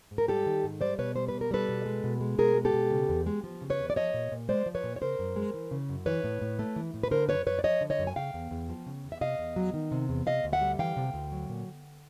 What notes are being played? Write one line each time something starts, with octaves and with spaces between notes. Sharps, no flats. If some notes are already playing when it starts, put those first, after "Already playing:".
G#2
A#4
G3 G4 A4
D#3
G#2
G3 C5 D5
B2 B4 C#5
G3 C5
B2 B4
A#4
G3 A4 B4
B2
G#3
B2
G#3
B2 G#4 A#4
G#3
G4 A4
B2
C#3
E2
G#3
F3
C#3
B4 C#5
E2
D5
F3 C#5 D#5
A#2
A#2
G#3 C5 D5
F3
B4 C#5
A#2
C#5
C#3 A#4 C5
F#2
G#3
E3
C#3
F#2
E3 B4 C#5
A2
A2
A3
E3
A2
B4
D3 A#4 C5
F#2 B4 C#5
F#2 B4 C#5
D5
F3 C#5 D#5
D3
C#5 D#5
F#2
G#5
C#3 F5 G5
E2
E2
F3
C#3
E2
E5
C3 D#5 F5
E2
F#3
D#3
C3
E2
C3 D#5 F5
D2
E5 F#5
G3
E3 F5 G5
C3
D2
F#3
A#2